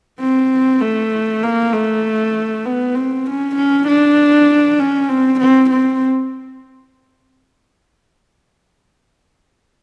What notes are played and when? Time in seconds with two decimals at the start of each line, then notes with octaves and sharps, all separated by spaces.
0.19 C4
0.81 A3
1.42 A#3
1.73 A3
2.65 B3
2.94 C4
3.26 C#4
3.56 C#4
3.87 D4
4.79 C#4
5.09 C4
5.40 C4
5.70 C4